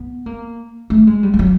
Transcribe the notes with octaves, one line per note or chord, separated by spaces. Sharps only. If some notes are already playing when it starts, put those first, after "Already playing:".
Already playing: B3
A#3
A3
G#3
G3
G3
F#3